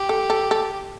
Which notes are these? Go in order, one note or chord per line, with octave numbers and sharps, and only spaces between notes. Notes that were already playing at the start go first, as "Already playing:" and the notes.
Already playing: G4
A4
A4
A4